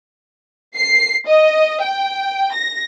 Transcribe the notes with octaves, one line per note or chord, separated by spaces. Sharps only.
C7
D#5
G5
A#6